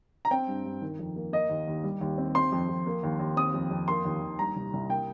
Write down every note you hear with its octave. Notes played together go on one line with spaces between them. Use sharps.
A#5
C4 G5
G2
G2
D#3
F2
A#3
A#3 D#5
D#2
D#2
G3
D#2
C4
C4 C6
F2
F2
A#3
D#2
D#2
C4 D#6
F2
F2
A#3 C6
D#2
D#2
G3 A#5
C2
C2
A#3 G5